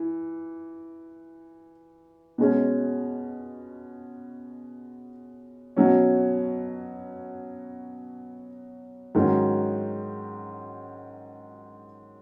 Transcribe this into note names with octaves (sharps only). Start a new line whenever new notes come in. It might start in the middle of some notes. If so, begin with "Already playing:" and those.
Already playing: E3
B2 G#3 C#4
B2 F#3 C#4
G#2 D#3 F#3 C#4